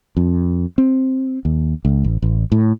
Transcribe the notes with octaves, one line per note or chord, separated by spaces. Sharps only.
F2
C4
D#2
C#2
A1
A1
A2